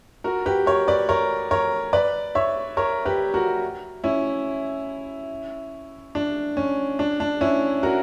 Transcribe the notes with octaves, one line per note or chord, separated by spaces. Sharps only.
F#4 A#4
G4 B4
A#4 C#5
B4 D5
A#4 C#5
A#4 C#5
B4 D5
C#5 E5
A#4 C#5
G4 B4
F#4 A#4
C#4 E4
D4
C#4
D4
D4
C#4 E4
F#4 A#4